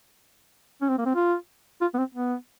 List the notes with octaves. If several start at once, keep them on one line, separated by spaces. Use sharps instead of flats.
C#4
C4
A#3
C4
F4
F4
B3
C4
B3